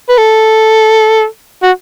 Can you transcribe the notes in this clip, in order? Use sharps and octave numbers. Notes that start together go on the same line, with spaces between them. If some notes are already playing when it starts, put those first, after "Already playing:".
B4
A4
F#4